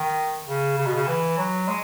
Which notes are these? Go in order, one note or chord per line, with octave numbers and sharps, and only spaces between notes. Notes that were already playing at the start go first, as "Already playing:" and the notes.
Already playing: D#3
C#3
C#3
B2
C#3
E3
F#3
G#3